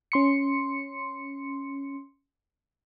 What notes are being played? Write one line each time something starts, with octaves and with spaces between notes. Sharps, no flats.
C#4 C6 C#7